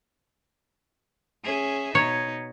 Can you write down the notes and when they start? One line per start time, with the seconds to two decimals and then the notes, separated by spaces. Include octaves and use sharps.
1.44 C#4 G#4 E5
1.95 B2 D#4 C#5 A#5 G#6 C#7